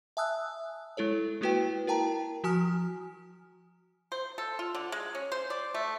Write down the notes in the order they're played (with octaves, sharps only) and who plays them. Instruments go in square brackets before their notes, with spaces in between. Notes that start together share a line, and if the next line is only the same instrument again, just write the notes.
[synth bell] E5 G#5 A5 D#6 E6 F#6
G#3 E4 A4 C#5
G#3 A#3 E4 F#4 B4 G5
E4 A#4 G5 A5 A#5
F3 F#4 G#5 D#6 F6
[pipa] C5
A4
F4
D3
G#3
C#4
C5
D5
A3